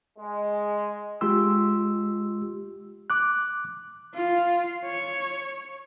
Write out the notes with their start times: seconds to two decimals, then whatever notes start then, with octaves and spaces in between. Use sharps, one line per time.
0.17 G#3
1.21 G#3 F4 G4 C6 E6
3.10 D6 F#6
4.15 F4
4.85 C#5